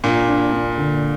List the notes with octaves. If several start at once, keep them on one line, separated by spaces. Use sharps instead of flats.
A#2 D4
D4
D4
D3